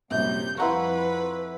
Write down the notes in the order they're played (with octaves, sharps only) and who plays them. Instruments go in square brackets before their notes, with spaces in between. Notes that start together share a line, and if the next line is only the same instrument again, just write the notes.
[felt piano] A#1 F#2 [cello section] C3 G3 [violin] G6
[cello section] F2 [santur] E4 F#5 C#6 [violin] B4 [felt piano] F5 A#5 C6